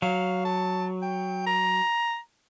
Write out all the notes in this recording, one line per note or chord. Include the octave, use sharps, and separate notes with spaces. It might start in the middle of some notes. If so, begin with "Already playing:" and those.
F#3 F5
A5
G5
A#5